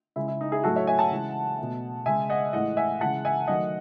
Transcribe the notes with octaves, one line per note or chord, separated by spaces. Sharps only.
C#3 G#3 E4
E4
D#4
E4 G#4
A2 F#3 A3 F#4 A4
C#5 E5
E5 G#5
F#5 A5
C#3 E3 G#3
B2 A3
C#3 G#3 E5 G#5
D#5 F#5
A2 E3 G#3 D#5 F#5
E5 G#5
C#3 E3 G#3 F#5 A5
E5 G#5
D#3 F#3 A3 D#5 F#5